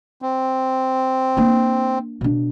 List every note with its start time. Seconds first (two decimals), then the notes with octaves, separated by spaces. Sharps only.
0.22 C4
1.37 A#3 D4
2.21 B2 D4